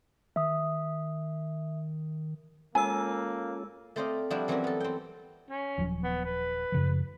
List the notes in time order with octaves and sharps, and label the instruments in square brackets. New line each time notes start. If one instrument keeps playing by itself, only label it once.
[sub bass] D#3 [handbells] E5 D#6
[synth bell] G#3 E6 [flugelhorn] A#3 [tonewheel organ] C#4 F4 A4 [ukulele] G#5
[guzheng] A3 C4 C5 D5 D#5 F5
F3 G3 D4 E4 F#4
E3 F#3 C4 C#4 F#4 A#4
B3 A4
C4 G5
[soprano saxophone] C#4
[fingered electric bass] D#1 F3 F#3
[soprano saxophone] B3
B4
[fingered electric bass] F#2 C#3 F3